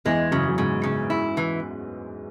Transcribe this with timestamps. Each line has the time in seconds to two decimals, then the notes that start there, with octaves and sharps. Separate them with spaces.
0.05 E2 E3 G#3
0.31 F#2 C#3 F#3
0.49 F#3
0.58 G#2 C#3 G#3
0.83 C#3
1.10 E4
1.37 E3